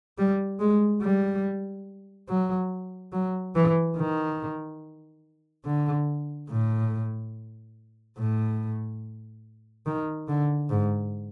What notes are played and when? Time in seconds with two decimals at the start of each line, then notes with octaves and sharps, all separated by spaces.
0.18 G3
0.60 G#3
1.02 G3
2.28 F#3
3.13 F#3
3.55 E3
3.97 D#3
5.65 D3
6.49 A2
8.18 A2
9.86 D#3
10.28 D3
10.70 G#2